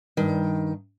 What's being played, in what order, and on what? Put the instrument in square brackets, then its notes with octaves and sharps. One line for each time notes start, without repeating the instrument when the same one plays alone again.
[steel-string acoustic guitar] G2 D#3